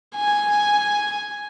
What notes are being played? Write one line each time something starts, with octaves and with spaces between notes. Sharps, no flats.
G#5